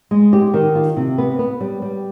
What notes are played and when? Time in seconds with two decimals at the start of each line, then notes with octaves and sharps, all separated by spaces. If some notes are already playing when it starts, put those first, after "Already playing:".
0.11 G#3
0.33 G4
0.54 D#3
0.75 F4
0.97 C3
1.18 B3
1.39 B3
1.61 G3
1.82 G3